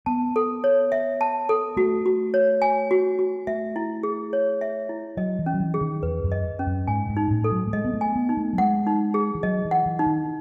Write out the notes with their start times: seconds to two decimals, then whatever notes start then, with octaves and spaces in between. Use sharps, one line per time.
0.06 B3 A5
0.36 A4
0.64 C#5
0.92 E5
1.21 A5
1.49 A4
1.77 A3 F#4
2.06 F#4
2.34 C#5
2.62 G#5
2.91 F#4
3.19 F#4
3.47 A3 E5
3.76 E4
4.03 G#4
4.33 C#5
4.61 E5
4.89 E4
5.17 F#3 D#5
5.39 E3
5.46 C#4
5.54 F#3
5.60 E3
5.74 G#4
5.81 D#3
6.02 E2 B4
6.24 F#2
6.32 D#5
6.59 C#4
6.67 F#2
6.87 G#2 G#5
7.09 G#2
7.17 D#4
7.31 A2
7.44 A4
7.51 F#3
7.67 A3
7.73 G#3 D#5
7.85 B3
7.94 A3
8.01 G#5
8.16 B3
8.29 D#4
8.37 A3
8.53 F#3
8.58 G#3 F#5
8.87 D#4
9.14 G#4
9.35 E3
9.43 F#3 D#5
9.65 E3
9.71 F#5
9.86 E3
9.99 D#4
10.06 D#3